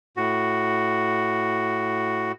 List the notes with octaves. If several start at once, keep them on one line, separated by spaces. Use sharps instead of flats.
A2 F#4